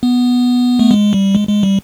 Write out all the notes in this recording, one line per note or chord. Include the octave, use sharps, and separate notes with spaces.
B3
A3
G#3
G3
G#3
G#3
G3